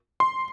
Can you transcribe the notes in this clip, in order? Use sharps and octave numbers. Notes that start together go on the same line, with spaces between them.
C6